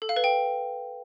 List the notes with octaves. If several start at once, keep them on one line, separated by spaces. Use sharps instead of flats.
A4
F5
B4
G5